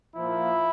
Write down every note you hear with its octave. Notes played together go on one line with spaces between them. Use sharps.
A#2 F3 A#3 E4